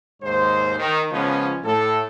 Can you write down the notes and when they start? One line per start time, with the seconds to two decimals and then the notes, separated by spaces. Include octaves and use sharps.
0.22 D#2 G#2 C5
0.78 D#3
1.12 C#2 F3 B3 C#4
1.64 A2 A4